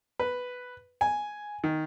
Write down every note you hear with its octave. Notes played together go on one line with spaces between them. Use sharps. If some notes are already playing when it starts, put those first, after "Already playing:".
B4
G#5
D#3